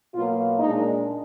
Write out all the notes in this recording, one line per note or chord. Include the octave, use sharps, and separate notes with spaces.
B2 F#3 A#3 F4
A#2 G#3 D4 D#4